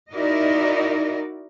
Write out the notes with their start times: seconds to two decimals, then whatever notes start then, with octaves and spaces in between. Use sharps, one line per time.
0.11 D#4 E4 F#4 A#4 D5 D#5